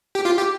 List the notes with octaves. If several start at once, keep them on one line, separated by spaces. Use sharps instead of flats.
G4
F4
G4